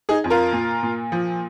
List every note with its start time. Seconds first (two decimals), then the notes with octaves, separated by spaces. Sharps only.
0.09 D#4 G#4
0.24 F2
0.30 F4 A#4
0.52 A#2
0.83 A#2
1.12 F3